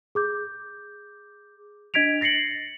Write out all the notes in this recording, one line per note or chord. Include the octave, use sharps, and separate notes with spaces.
G#4 D6 G6
D4 D#5 G#6 B6 D7 F7
A6 A#6 C7 C#7 F#7